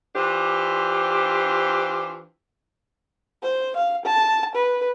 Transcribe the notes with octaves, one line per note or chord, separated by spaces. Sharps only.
E3 D4 F4 G4 C5
C5
F5
A5
B4